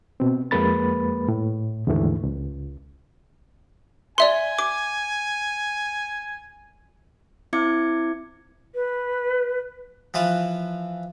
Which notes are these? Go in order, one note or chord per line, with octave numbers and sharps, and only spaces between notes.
B2 C4
F2 G#3 A#3 B4 B5 A6
A2
D#2 G#2 D3 E3 A3
C#2
D5 E5 G#5 C6
D6
C4 E4 E5 D6 G#6 C#7
B4
E3 F3 B4 A5